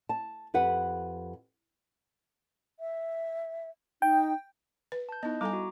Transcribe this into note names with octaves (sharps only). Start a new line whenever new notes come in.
A5
F2 G4 B4 F#5
E5
D#4 G5
B4
A5 G6
B3 D#4 E4 D#5
G3 A4 G#5 A#5 D6
F#4